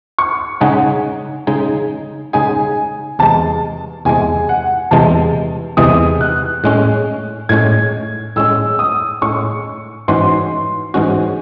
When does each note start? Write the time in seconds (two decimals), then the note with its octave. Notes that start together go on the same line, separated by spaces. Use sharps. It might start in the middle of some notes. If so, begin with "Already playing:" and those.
0.19 C#6
0.61 C#3 G#3 D#4 G#4 F#5
1.47 C#3 G#3 D#4 G#4
2.33 C#3 G#3 D#4 G#4 G#5
3.19 E2 C3 E3 G#3 A5
4.05 E2 C3 E3 G#3 G#5
4.49 F#5
4.91 E2 C3 E3 G#3 A5
5.77 E2 C3 E3 G#3 D#6
6.21 F#6
6.64 A2 G#3 C#4
7.49 A2 G#3 C#4 G#6
8.36 A2 G#3 C#4 E6
8.79 D#6
9.22 A2 G#3 C#4 C#6
10.08 G#2 E3 G#3 C#4 F#4 C6
10.94 G#2 E3 G#3 C#4 F#4